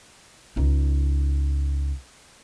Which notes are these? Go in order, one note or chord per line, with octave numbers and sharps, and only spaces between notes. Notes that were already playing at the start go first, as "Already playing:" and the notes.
C#2 D#4